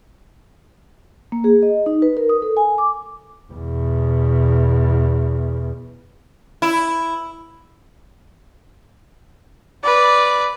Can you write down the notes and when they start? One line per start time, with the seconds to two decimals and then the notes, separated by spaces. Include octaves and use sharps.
1.32 A#3
1.44 G#4
1.63 D#5
1.86 D#4
2.02 B4
2.17 A#4
2.29 D#6
2.42 A4
2.57 G#5
2.78 D6
3.52 E2 B2
6.62 E4
9.84 B4 D5